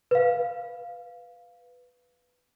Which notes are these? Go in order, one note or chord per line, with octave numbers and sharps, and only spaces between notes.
B4 F5